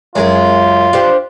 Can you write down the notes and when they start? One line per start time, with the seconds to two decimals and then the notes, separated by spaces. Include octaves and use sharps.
0.16 F#2 G#3 F4 G#4 A#4
0.93 D4 G4 C5